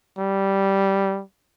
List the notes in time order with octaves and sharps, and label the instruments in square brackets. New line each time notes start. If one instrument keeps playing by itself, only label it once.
[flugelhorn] G3